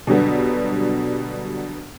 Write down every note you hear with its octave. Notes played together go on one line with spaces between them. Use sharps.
B2 D3 F#3 G3 B3